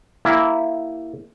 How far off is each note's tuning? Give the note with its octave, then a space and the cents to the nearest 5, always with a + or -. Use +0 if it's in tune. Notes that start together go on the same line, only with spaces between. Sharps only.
A#3 +0 E4 +0 G4 +0